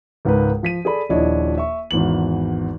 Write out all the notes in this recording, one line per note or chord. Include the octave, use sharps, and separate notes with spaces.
C#2 G#2 A#4 B4
F3 B6 D#7
G#4 A4 D5 B5
D#1 F3 D4 E4 C#5 D#5
E5 C#6
G#1 E2 E3 F#7